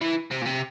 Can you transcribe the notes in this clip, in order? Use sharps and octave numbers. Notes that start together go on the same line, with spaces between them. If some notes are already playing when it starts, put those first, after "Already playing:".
E3
C3
A#2
C3